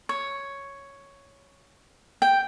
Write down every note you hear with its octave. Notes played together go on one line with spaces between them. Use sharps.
C#5
G5